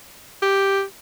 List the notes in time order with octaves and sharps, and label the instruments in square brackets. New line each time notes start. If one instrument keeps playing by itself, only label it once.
[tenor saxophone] G4